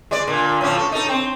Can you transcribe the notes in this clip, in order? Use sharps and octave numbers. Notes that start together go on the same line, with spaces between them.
G#3 D5
A#2 D3
A2 F3 C#4
A4
D#4 A4
C4